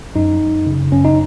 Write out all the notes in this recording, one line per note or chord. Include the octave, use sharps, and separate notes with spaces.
F#2 D#4
F#2
C#3
F#2 C#4
D#4